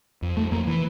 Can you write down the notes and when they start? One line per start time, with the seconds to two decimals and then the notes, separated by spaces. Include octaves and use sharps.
0.22 F2
0.37 F2 A3
0.51 F2 A#3
0.67 E3